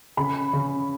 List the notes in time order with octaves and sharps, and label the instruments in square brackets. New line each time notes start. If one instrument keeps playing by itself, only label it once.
[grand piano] C#3 [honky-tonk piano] B5
[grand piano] C#3